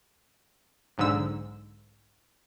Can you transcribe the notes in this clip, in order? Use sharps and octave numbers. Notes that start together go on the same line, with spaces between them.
B1 G#2 D3 E6